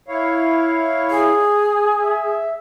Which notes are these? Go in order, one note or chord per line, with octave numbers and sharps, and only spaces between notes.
E4 C#5 F5
G#4
E5